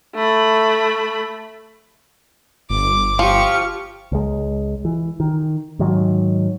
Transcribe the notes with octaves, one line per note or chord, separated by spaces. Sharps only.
A3 B5
G1 D6
F3 F4 G4 C#6
C#2 G#3
E3
D#3
G#2 D#3 F#3